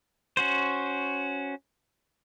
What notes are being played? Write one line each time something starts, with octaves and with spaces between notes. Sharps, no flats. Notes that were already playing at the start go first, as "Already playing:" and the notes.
C#4 F#4 C5